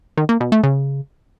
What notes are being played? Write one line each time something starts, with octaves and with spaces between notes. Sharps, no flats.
D#3
A#3
B2
A3
C#3